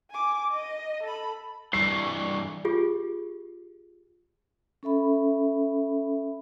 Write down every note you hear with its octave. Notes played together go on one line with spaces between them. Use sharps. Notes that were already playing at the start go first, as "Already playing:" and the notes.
G#5 D6
D#5
A4 B5
G2 E3 G3 C#6 C7
F4 G4 G#4
C#4 A4 E5 B5